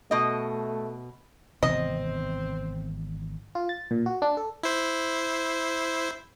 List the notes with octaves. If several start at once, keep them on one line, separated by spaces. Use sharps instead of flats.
B2 A3 D#5
G#1 C3 E3 B3 C4 D#5
F4
A6
A#2
F#4
D4
A4
E4 C5